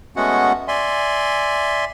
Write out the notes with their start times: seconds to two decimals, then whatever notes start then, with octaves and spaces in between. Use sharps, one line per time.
0.16 G#3 A3 B3 C#4 F#4 F#5
0.68 D5 E5 G#5 C6